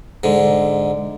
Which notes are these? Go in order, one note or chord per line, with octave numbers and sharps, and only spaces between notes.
G#2 D3